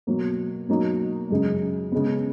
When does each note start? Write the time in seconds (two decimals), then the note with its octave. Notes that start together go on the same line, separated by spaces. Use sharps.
0.07 B2 F#3 A#3
0.69 B2 F#3 A#3 D#4
1.30 F#2 C#3 G#3
1.92 C#3 G#3 B3